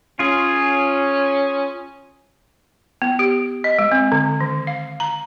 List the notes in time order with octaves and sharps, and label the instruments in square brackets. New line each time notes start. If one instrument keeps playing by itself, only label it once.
[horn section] C#4 [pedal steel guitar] F4 G#4
[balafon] B3
G4
D#5
G#3
C4
D3
D#3
F5
A#5